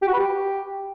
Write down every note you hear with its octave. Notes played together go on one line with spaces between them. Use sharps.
G4
F#4
B4
G4